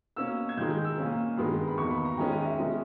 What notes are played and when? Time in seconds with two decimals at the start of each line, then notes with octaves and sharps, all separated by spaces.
0.16 B2 A#3 C#4 E6
0.49 G#6
0.57 G#2 D#3 G#3 G6
0.71 G6
0.85 E6
0.98 A#2 A#3 C#4
1.37 G2 D#3 G#3 B3 B5
1.67 B5
1.78 E2 D#3 A#3 C#6
1.91 B5
2.05 A#5
2.18 G#2 D#3 G#3 C#4 G5
2.31 D#5
2.45 E5
2.59 B2 G#3 C#4